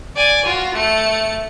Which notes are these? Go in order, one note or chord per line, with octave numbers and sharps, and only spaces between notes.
D5 G#5
F4 F#4
A3 C#7